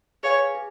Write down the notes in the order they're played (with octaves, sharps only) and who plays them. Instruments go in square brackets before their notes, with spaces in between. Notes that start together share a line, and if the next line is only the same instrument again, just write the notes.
[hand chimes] G#4 B4 F5 G#5 [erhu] C#5
[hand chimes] G#4